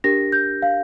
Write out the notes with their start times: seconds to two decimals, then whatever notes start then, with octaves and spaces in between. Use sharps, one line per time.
0.04 D4 G4 A#4 A#6
0.32 G6
0.62 F5